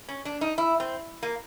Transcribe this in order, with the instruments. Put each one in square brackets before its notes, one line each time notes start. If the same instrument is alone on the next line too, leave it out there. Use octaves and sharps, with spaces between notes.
[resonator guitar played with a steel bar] C#4
D4
D#4
E4
C4
A#3